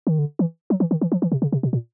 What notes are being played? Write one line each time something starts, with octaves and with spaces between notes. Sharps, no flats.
D#3
D3
E3
F#3
E3
D#3
E3
F3
E3
C3
C#3
C3
B2
A#2